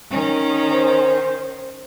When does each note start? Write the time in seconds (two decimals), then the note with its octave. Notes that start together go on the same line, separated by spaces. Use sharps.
0.10 D#3 C#4
0.71 C5